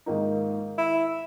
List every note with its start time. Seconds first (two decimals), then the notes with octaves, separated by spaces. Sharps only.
0.06 G#2 D#3 A#3 D#4
0.78 E4